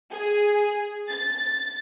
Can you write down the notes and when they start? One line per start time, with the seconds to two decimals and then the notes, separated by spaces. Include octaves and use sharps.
0.12 G#4
1.08 A6